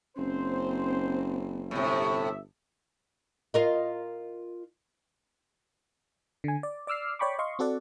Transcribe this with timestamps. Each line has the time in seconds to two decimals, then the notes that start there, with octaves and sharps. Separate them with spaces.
0.18 F#1 C4 C#4 C5
1.71 G1 A2 C3 E5
3.54 F4 A#4 D#5
6.44 D3 G#5
6.63 D5
6.87 D5 D6 E6 F6 C7
7.19 C#5 D5 G5 B5 C#6 D6
7.39 D#5 F5 C6 C#6
7.59 C4 F#4 A4 D5 F#5